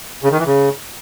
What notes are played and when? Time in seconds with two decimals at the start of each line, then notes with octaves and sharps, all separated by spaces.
0.24 C#3
0.31 D#3
0.39 E3
0.47 C#3